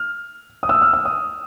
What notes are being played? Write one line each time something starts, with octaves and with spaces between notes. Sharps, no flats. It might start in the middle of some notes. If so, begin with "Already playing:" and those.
Already playing: F6
D#6
E6
F6
E6
D#6